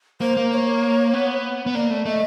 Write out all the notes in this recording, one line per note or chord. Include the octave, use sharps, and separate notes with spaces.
A#3 C5
A#3
C#5
B3
B3
A#3 D5
A3
A3 D#5